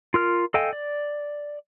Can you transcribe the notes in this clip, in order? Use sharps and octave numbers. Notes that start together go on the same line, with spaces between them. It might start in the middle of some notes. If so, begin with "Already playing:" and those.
F4 A#4 F6
A4 D#5 F5 G5 G#5
D5